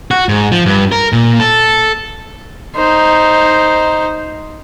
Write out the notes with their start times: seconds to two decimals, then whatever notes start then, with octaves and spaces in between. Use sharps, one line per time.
0.11 F#4
0.29 G#2
0.52 F3
0.66 G2
0.92 A#4
1.13 A#2
1.40 A4
2.76 D#4 C5